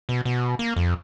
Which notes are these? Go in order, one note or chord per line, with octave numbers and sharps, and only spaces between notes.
B2
B2
A#3
F2